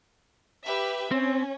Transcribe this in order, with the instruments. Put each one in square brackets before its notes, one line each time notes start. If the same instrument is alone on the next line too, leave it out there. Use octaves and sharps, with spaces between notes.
[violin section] G4 B4 E5
[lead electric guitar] C4 [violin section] C#4